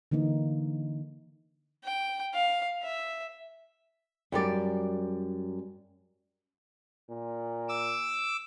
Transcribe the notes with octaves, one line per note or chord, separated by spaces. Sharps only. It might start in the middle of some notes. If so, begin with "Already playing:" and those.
D3 E3 A#3 D#4
G5
F5
E5
F#2 G3 D5
A#2
D6 E6